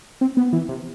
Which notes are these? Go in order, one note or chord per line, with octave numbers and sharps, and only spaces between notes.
C4
B3
E3
C3